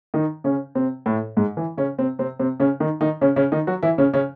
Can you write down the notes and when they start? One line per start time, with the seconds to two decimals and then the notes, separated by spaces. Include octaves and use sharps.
0.14 D#3 D#4
0.44 C#3 C#4
0.75 C3 C4
1.06 A2 A3
1.37 G#2 G#3
1.57 E3
1.78 C#3 C#4
1.98 C3 C4
2.19 C3 C4
2.39 C3 C4
2.60 C#3 C#4
2.80 D#3 D#4
3.01 D#3 D#4
3.21 C#3 C#4
3.36 C#3 C#4
3.52 D#3 D#4
3.67 F#3 F#4
3.82 E3 E4
3.98 C#3 C#4
4.13 C#3 C#4